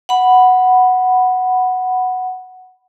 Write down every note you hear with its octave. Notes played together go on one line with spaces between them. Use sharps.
F#5 B5